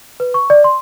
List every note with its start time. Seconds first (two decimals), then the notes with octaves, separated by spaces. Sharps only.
0.20 B4
0.34 C#6
0.50 D5
0.64 C6